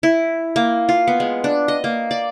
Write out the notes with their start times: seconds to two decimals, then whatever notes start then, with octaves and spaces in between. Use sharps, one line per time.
0.03 E4
0.56 A#3
0.89 F4
1.08 B3
1.20 G#3
1.44 D4
1.68 D#5
1.84 A#3
2.11 D5